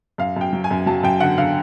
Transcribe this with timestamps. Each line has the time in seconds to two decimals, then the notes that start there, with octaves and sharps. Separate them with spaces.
0.18 F#2 F5
0.36 F#2 G5
0.53 F#3
0.64 G#5
0.71 F#2
0.86 F#3 A5
1.03 F#2 G5
1.20 D3 F#5
1.38 D3 F5